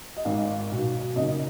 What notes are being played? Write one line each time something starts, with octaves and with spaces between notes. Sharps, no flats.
D#5
G#1 G#2 D#3 F5
B1 B2
F#1 F#2 D#3 D#5